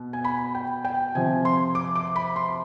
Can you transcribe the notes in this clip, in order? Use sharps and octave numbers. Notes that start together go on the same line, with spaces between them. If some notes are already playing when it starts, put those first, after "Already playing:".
Already playing: B2
G#5
B5
G5
G5
C3 F3 G#5
C6
D6
D6
B5
C6